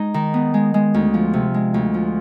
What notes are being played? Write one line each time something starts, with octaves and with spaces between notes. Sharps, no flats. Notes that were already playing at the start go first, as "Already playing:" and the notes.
Already playing: G#3 D#4
D#3
B3
G#3
G#3
D2
F3
C3
G#3
D2
F3